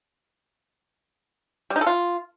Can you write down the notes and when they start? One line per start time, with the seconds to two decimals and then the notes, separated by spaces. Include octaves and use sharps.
1.70 G3
1.76 D#4
1.81 A4
1.86 F4